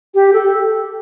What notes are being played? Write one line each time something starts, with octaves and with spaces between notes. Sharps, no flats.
G4
A4